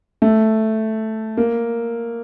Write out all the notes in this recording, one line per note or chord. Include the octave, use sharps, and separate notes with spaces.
A3
A#3